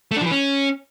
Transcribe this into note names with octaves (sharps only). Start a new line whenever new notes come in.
A3
D4
F3
E3
C#4